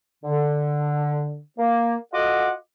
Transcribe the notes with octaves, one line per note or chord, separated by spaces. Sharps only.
D3
A#3
F4 F#4 A4 D#5 F#5 D6